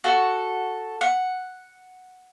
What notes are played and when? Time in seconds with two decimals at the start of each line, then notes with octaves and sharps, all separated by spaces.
0.04 F#4 A4
1.01 F#5